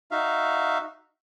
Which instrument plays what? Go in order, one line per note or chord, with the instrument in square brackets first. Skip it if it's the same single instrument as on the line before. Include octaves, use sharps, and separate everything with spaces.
[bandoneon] D#4 F#4 E5 F5